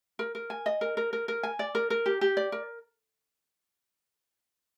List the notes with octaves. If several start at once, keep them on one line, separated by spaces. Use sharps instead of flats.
A#4
A#4
G#5
D#5
A#4
A#4
A#4
A#4
G#5
D5
A#4
A#4
G4
G4
D5
A#4